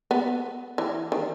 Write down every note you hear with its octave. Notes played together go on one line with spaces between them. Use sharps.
B3
E3
D#3